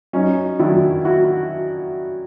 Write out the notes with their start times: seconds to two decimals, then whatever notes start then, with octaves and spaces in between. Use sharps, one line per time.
0.13 F#2 C#4 D#4
0.59 D#3 F#3 D4 E4
1.05 E4 F#4